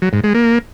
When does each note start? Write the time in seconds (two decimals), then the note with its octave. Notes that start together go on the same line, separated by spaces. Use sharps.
0.02 F#3
0.13 G#2
0.24 G#3
0.34 A#3